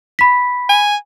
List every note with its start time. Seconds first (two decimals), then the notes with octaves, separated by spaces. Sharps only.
0.19 B5 B6
0.69 G#5